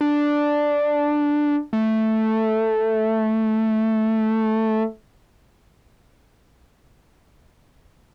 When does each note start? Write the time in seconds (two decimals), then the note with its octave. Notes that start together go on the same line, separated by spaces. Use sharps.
0.01 D4
1.73 A3